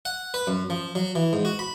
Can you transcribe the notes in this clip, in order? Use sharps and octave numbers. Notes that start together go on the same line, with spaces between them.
F#5
B4
F#2
F3
F#3
E3
G#2
F#4
B5